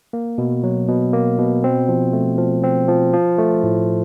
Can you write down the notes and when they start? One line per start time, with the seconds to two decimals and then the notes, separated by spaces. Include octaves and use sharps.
0.13 A#3
0.38 B2
0.63 F#3
0.88 B2
1.13 A#3
1.39 B2
1.64 C4
1.89 F3
2.13 A3
2.38 F3
2.63 C4
2.88 F3
3.13 F3
3.38 A3
3.63 A2